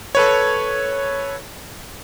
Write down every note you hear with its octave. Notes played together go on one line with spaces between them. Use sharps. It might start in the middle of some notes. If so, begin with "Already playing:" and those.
A4 B4 C#5